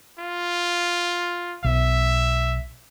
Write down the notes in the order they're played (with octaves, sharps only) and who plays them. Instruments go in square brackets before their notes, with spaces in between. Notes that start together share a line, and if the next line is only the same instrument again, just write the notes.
[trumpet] F4
[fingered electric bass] B1 [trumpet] E5